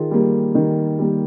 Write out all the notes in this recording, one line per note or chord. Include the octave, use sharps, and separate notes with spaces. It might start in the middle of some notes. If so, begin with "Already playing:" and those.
Already playing: D#3 F4 G#4
G3 A#3
D#3
G3 A#3